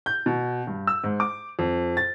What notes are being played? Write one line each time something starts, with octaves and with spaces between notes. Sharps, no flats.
G6
B2
G2
E6
G#2
D6
F2
A6